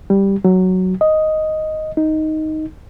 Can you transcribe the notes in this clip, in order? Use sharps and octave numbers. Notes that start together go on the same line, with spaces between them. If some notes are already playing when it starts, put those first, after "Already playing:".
G3
F#3
D#5
D#4